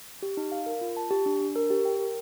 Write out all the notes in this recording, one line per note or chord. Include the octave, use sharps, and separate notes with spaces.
G4
D#4
F5
A#4
F4
A5
G4
D4
D4
A#4
G4
G5
A#4